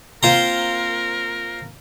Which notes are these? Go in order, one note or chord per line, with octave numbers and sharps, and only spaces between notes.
A#3 C4 F4 A#4 C5 A#5